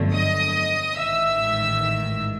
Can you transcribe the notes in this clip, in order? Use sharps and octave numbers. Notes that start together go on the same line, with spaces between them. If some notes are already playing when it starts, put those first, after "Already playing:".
Already playing: G1 F2 D3 F#3 A3
D#5 D#6
A1 G#2 D#3 E5 E6